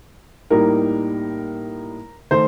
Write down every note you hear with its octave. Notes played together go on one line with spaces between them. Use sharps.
A2 G3 A#3 D#4 A#4
D#3 A3 C5